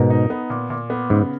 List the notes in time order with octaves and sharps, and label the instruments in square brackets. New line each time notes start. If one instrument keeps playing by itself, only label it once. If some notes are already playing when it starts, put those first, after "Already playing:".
Already playing: [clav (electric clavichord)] G#2 B2 [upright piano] A#4
[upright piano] D#4
B3
A#2
A#2
B3
[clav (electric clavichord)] G#2 [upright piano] C#3